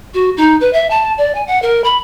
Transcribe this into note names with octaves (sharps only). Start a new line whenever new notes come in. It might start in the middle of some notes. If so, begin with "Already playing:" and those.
F#4
D#4
B4
E5
A5
D5
G#5
F#5
A#4
B5